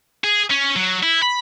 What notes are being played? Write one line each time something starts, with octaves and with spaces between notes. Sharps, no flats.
G#4
C#4
F#3
E4
B5